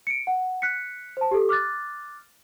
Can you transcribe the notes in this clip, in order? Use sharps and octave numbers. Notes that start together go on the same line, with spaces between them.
C#7 D7
F#5
F#6 B6 C#7
C5 A5
G4 A4
D6 F6 F#6 A6